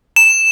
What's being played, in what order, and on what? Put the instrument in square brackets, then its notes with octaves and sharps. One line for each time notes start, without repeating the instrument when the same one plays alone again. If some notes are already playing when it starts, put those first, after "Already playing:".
[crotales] E7